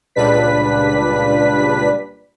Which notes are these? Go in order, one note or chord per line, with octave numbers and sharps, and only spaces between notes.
C#2 A#2 G3 D4 B4 B6